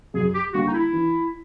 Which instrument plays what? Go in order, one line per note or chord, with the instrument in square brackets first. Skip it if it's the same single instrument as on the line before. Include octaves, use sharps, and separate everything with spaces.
[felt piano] F#2 [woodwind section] G#4
[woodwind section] G4
[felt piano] D3 G3 A#3 [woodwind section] F#4
[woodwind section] D#4
E4
[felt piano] E3